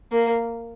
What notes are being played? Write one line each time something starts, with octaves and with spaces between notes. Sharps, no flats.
A#3